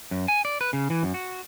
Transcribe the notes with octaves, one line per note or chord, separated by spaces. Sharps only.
F#2
G#5
D5
B4
C#3
E3
F#2
F#4